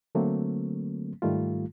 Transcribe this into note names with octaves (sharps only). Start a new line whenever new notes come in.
D3 F#3 A3 A#3 C4
G#2 D#3 G3 A3 F4